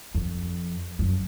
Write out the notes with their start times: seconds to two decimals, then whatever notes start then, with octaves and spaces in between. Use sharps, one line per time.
0.15 F2
0.99 F#2